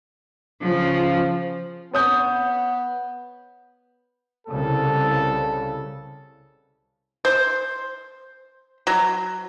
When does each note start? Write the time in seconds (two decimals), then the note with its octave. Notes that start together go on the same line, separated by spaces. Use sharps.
0.61 C#3 F3
1.94 B3 C#5 D#6 G6
4.47 C2 C#3 A4
7.25 C5
8.87 F#3